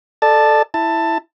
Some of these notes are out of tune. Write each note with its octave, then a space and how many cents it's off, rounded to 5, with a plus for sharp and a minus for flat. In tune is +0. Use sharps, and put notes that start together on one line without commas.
A4 +0 D5 +30 A5 +0
E4 +0 A5 +15